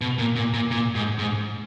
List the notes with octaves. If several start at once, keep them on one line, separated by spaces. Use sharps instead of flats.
B2
A#2
A#2
A#2
A#2
G#2
G#2